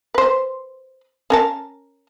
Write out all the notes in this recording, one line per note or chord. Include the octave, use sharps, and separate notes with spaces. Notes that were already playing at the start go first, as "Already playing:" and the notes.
B4 C5
C#4 A#4 A5